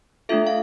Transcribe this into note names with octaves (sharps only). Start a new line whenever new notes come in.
A3 D4 F4 A4 E5
F5